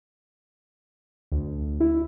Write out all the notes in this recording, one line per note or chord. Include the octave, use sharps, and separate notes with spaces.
D2
E4